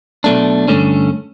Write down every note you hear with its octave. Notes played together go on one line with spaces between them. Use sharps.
B1 B2 A3 D4
G2 D3 A3 C#4